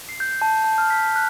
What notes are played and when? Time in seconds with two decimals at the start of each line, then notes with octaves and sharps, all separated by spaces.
0.09 C7
0.20 G6
0.42 A5
0.64 A5
0.78 F6
0.90 B6
1.16 F#6